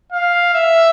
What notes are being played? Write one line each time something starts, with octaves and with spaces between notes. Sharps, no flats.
F5
E5